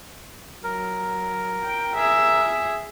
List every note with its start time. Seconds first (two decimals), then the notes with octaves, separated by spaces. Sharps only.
0.64 F#3 A#4
1.63 G5
1.95 G#4 E5